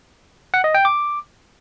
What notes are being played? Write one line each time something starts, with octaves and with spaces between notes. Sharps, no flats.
F#5
D#5
G5
D6